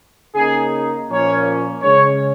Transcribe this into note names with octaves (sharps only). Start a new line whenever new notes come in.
C#3 A#3 D#4 G#4
A#2 F3 A#3 C#4 C#5
C#3 G#3 C#4 C#5